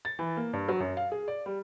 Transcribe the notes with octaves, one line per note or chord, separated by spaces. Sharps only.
A6
E3
A#3
G2
F#3
F#2
F5
G#4
D5
G3